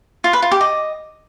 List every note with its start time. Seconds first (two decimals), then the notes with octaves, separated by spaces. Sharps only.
0.24 F4
0.33 B4
0.42 F4
0.51 G4
0.61 D#5